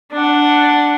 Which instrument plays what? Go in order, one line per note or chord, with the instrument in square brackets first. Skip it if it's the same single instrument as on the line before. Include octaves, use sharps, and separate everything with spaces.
[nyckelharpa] D4 F#5